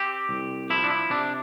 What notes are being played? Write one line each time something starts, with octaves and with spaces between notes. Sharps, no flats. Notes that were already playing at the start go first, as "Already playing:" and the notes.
Already playing: C4 G4
C2
F3 E4
D4
E4
C3 D4